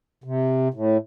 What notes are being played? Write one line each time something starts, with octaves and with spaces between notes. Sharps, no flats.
C3
A2